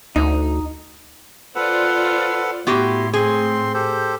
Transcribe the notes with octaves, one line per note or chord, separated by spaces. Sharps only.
D2 D#4
F4 A4 B4 C5 D5 F#5
A2 B3 E4 F#4 G4 C6
C4 G#4 C6
G4 A4 C5